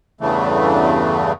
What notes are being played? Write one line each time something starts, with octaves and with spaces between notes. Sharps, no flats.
E2 G2 C#3 E3 A3